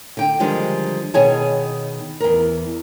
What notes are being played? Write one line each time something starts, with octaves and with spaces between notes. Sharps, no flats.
D3 G5
D3 D#3 F3 G3 G#3
B2 D#3 G#4 C#5 G#5 A5
E2 A#4